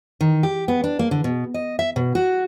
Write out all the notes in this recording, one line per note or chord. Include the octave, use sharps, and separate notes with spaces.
D#3
G4
B3
D4
A#3
D3
B2
D#5
E5
B2
F#4